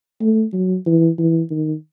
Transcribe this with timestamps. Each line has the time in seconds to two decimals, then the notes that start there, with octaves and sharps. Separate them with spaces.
0.21 A3
0.53 F#3
0.86 E3
1.18 E3
1.50 D#3